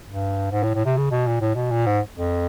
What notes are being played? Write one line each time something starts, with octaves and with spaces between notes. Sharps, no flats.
G2
G#2
A2
A2
C3
C#3
B2
A#2
A2
B2
A#2
G#2
F2